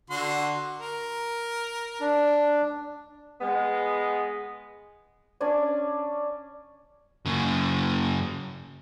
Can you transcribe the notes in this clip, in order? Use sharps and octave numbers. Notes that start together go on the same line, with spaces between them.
D3 F#4 C6
A#4
D4
G#3 B3
C#4 D4 D5 G#5
F#2 C#3